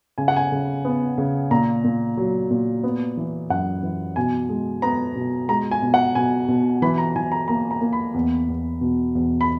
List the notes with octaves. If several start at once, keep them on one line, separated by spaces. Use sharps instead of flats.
C#3 G#5
F#5
G#5
C#3
B3
C#3
A#2 A#5
A#2
F#3
A#2
B3
E3
F#2 F#5
E3
B2 G#5
G#3
B3 A#5
B2
G#3 A#5
G#5
B2
F#5
B2 G#5
B2
E3 B5
A#5
E3 G#5
A#5
A#3 A#5
A#5
A#3
B5
E2
E2
B2
E2
B5